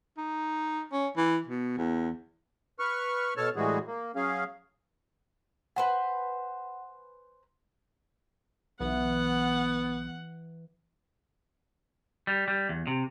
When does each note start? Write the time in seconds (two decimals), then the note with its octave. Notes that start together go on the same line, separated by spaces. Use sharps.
0.18 D#4
0.92 C#4
1.17 E3
1.47 B2
1.78 E2
2.79 B4 C#6 F6
3.37 B2 A4 C#5 A5 F6
3.56 A2 E3 G3 G#3 F#4 G#4
3.87 A#3
4.16 F#3 C#4 G#4 F5
5.76 B4 C5 F#5 G#5
8.80 B1 E3 B3 F#5
12.27 G3
12.48 G3
12.69 E2
12.87 C3